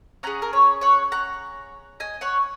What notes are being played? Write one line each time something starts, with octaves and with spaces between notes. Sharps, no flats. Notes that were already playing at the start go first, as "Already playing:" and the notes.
C#4 G#4 F#5 A#5
A#4
C#5
C#5 F#5
F#5 A#5
D#5 G#5
C#5 F#5